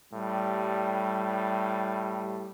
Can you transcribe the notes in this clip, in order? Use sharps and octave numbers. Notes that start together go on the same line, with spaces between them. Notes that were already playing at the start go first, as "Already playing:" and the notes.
A2 G3